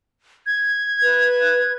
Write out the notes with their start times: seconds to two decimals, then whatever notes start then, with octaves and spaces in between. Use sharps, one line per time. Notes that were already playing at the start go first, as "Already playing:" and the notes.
0.46 G#6
1.03 B4